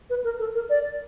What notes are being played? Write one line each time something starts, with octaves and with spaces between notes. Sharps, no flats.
B4
A#4
A4
A#4
D5